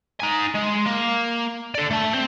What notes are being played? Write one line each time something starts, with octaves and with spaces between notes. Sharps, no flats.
D#4 G#5
G#3
A#3
A4 D5
A3 A5
C4 C5